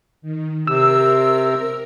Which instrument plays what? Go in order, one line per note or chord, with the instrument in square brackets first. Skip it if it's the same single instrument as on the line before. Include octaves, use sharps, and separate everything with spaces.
[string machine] D#3
[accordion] C3 [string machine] A#4 [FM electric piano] E6